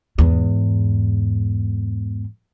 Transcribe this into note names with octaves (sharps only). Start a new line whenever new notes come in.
E2 G#2